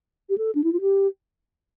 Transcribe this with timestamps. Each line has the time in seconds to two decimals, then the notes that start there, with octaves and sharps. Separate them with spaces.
0.29 G4
0.38 A4
0.55 D4
0.64 E4
0.73 F4
0.81 G4